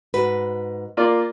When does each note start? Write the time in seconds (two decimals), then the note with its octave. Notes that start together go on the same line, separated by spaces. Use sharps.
0.14 G#2 F#4 B4
0.97 A#3 F4 D5